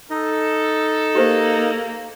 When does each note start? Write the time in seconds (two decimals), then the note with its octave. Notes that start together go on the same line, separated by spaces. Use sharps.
0.10 D#4 A4 D#5
1.15 A#3 G4 G#4 C5